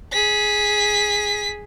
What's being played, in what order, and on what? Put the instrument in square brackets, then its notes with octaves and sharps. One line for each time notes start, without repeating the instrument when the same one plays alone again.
[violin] G#4 B6